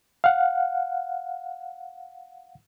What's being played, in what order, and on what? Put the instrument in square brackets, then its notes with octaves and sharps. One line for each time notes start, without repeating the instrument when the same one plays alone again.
[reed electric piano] F5 F#5